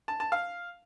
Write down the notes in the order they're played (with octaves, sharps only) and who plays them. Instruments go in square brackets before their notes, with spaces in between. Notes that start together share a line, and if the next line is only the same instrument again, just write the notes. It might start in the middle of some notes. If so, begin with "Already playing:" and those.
[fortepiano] A5
A5
F5